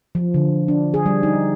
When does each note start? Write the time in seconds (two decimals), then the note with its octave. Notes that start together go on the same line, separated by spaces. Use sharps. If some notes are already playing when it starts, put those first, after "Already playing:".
0.15 F3
0.34 D3
0.68 D4
0.94 G#4
1.06 G3
1.23 D#4